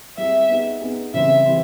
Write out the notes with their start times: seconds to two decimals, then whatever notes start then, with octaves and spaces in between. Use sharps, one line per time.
0.17 G3 C4 E4 G#4 E5
0.49 B3 D#4 G#4
0.82 B3 D#4 G#4
1.14 C#3 E3 G3 C4 E5
1.45 E3 G3 C4